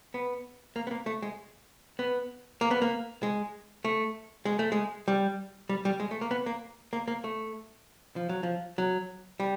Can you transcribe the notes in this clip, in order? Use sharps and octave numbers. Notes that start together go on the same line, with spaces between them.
B3
A#3
B3
A#3
A3
G#3
B3
A#3
B3
A#3
G#3
A3
G#3
A3
G#3
G3
G3
G3
G#3
A3
A#3
B3
A#3
A#3
A#3
A3
F3
F#3
F3
F#3
G3